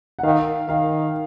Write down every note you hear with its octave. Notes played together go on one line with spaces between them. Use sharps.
F#5
D#3 F5
D#3 F5